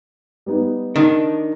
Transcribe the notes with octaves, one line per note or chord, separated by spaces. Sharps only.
G3 B3 D#4
D#3 D4 D#4